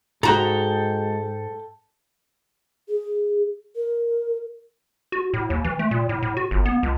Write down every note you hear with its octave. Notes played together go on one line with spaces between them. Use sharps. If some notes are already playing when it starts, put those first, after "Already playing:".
G#2 G#3 F#4 A4 G5 A#5
G#4
A#4
F#4
A2
D#2
E3
A3
A#2
A2
A2
F#4
G1
B3
C#2